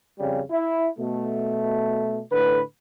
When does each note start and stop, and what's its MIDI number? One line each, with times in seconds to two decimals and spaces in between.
0.19 0.41 41
0.19 0.41 49
0.19 0.41 55
0.51 0.88 64
0.99 2.21 47
0.99 2.21 57
2.32 2.61 45
2.32 2.61 50
2.32 2.61 71